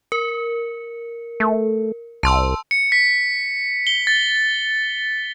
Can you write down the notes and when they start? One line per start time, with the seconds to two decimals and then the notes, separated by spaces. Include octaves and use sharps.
0.12 A#4
1.40 A3
2.23 C2 A5 C6 E6
2.71 C#7
2.92 B6
3.87 G7
4.07 A6